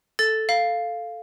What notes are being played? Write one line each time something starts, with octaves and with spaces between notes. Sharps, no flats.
A4 A6
F5